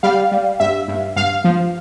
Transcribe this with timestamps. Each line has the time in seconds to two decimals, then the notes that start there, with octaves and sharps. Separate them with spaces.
0.03 G3 F5
0.32 G3
0.60 G2 E5
0.88 G2
1.16 G2 F5
1.44 F3